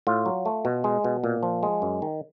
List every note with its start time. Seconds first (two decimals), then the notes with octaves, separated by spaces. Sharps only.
0.07 A2 F4
0.26 F#3
0.45 A3
0.65 B2
0.84 G#3
1.04 B2
1.24 A#2
1.43 F3
1.63 G#3
1.82 F#2
2.02 D#3